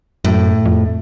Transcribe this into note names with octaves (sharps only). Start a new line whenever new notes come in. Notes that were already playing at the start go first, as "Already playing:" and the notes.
F#2 A2
F2